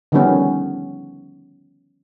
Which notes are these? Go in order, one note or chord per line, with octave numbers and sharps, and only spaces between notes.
D3 D#3 F3 G3 B3 C#4